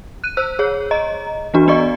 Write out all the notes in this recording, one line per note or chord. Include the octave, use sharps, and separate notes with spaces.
F#6 D#7
C5 E6 F#6
G#4 C#5
D#5 A#5
E3 B3 D4 F#4
B3 D5 D#5 C#6